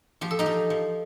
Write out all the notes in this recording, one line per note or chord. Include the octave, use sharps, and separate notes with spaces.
F3 G4
A4
D#4 G4
F3
F3